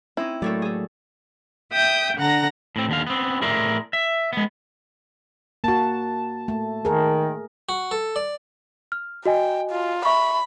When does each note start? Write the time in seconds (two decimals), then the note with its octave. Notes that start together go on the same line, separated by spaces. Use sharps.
0.17 C4 C#4 D#4 E4
0.42 A2 F#3 A3 A#3 A4 C#5 D5
0.62 G#4 A4
1.73 E5 G5 D#6 G6
2.18 D3 F#5 A#5 A#6
2.76 A2 C4
2.89 D#2 D3 F5
3.07 B3 C4
3.42 A2 G#4 A#4 D5 E5 C6
3.93 E5
4.33 G#3 B3
5.64 A#3 F#4 A5
6.48 A3
6.85 D#3 G#4 A#4
7.69 F#4
7.91 A4
8.16 D5
8.92 F6
9.26 F#4 D#5 G5 G#5
9.71 F4
10.05 E5 B5 C#6